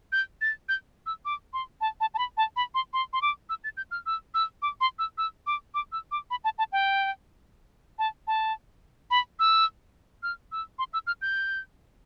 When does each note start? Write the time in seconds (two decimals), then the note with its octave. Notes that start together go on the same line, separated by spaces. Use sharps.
0.12 G6
0.41 A6
0.69 G6
1.06 E6
1.25 D6
1.53 C6
1.81 A5
2.00 A5
2.14 A5
2.18 B5
2.37 A5
2.56 B5
2.75 C6
2.93 C6
3.13 C6
3.22 D6
3.49 E6
3.64 A6
3.77 G6
3.91 F6
4.06 E6
4.34 E6
4.62 D6
4.81 C6
4.99 E6
5.18 E6
5.47 D6
5.74 D6
5.92 E6
6.11 D6
6.31 B5
6.44 A5
6.58 A5
6.72 G5
7.99 A5
8.27 A5
9.11 B5
9.39 E6
10.23 F6
10.52 E6
10.79 C6
10.93 E6
11.07 F6
11.22 G6